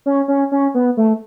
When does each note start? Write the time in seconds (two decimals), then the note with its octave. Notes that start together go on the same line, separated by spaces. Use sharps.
0.06 C#4
0.28 C#4
0.52 C#4
0.74 B3
0.97 A3